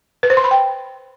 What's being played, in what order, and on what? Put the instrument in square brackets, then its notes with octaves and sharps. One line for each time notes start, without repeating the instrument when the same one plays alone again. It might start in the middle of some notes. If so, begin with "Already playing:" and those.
[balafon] B4
C5
C6
B5
G5